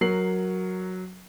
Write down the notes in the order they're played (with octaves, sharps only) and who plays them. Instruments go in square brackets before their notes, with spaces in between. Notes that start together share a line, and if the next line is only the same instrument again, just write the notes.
[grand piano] F#3 A#4 C7 F#7